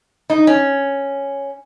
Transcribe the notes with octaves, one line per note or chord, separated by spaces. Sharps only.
D#4
C#4